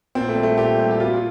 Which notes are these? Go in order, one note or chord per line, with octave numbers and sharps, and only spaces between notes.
A#2 C4
A3
G3
A3
A#2 G4
G3
G4
A#2 F4
F4